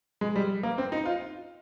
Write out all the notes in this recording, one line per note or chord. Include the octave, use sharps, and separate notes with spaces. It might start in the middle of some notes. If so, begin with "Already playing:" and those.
G#3
G3
A#3
C4
D#4
F4